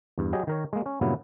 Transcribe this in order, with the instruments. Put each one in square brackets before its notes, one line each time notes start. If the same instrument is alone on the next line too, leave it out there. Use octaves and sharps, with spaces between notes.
[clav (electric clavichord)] E2 G2
F#3 G4 G#4 D#5
D#3 A#4 C#5
G#3 A#3
C#4
G2 A#2 C#3 F#3 B3 E4